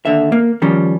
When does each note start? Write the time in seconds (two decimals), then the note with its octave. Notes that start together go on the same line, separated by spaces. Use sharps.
0.05 D#2 D3 E5
0.32 A#3
0.62 D#3 F3 G3 C#4